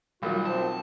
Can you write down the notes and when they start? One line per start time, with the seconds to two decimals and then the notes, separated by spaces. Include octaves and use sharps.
0.23 B1 G3 F4 F#4 A#4 F5
0.45 C4 A5